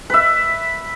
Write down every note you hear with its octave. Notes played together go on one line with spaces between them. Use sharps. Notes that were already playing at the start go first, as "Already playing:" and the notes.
B4 E5